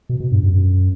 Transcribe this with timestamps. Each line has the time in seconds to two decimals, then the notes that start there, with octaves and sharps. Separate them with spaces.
0.09 B2
0.20 B2
0.31 G2
0.43 F#2